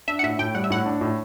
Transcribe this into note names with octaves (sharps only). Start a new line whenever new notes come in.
D4 E5
F#5
A2 E5
A2 G5
G3 F#5
E5
A2 F#5
D4
A2